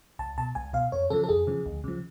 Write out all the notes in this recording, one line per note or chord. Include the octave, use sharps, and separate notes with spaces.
C#2 A5
B2 A5
C#2 G#5
B2 F5
F2 C#5
C#3 F3 A4
A4
F2 G#4
C#3 F3
D2
C#3 F3